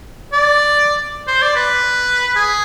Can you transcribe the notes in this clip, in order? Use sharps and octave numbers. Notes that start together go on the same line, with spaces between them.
D5
C5
D5
B4
G#4